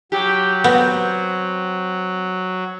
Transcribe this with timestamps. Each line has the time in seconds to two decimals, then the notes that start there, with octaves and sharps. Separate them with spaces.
0.12 F#3 G4
0.64 B3 C4